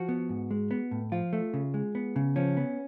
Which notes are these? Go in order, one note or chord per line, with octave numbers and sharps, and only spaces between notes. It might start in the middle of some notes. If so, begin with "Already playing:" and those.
Already playing: F3 F#4
B3
G#2
G#3
B3
A2
F3 F4
A3
C#3
G#3
B3
C#3
F3 C#4
B3